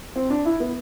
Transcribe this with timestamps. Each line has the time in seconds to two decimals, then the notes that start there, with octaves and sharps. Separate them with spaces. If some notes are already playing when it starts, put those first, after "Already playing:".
0.16 C4
0.30 D4
0.45 E4
0.60 B3